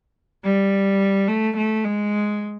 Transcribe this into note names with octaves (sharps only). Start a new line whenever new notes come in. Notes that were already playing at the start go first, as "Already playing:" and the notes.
G3
A3
A3
G#3